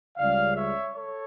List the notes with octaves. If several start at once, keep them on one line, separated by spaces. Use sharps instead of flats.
C#2 C#3 G3 D5 F5
C#5 E5
A4 C#5